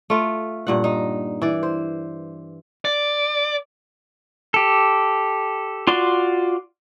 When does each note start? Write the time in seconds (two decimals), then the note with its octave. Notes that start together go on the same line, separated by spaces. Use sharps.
0.10 A3 F4
0.67 G2 A#2 F#5
0.84 D#4
1.42 E3 D5
1.63 C5
2.85 D5
4.54 G4 A4
5.87 F4 F#4 D5 C6